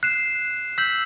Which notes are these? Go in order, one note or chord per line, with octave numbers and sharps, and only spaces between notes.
F#6 C7 E7
E6 G6 B6 F#7